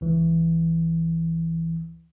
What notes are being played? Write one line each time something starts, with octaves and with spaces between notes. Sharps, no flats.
C#2 E3